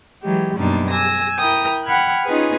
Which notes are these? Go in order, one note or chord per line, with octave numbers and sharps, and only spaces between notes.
E3 F#3 G#3 G4
F#2 B2 G3 A#3 D4 D#4
G#5 E6 A#6
E4 A#4 G5 D#6 G6
F#5 G5 B5 F6 F#6 G#6
C#4 D#4 F4 G#4 B4